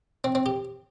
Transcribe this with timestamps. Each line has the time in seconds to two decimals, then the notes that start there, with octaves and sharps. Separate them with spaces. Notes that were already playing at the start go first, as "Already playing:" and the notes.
0.24 C4
0.35 C4
0.46 G4